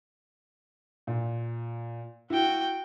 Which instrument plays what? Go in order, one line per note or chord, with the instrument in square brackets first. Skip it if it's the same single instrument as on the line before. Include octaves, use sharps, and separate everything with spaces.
[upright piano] A#2
[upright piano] E4 [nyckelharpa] F#4 G5